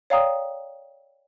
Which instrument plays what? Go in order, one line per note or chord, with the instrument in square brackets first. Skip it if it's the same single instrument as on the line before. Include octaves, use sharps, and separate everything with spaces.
[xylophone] C#5 D5 F5 G5 A#5 D#6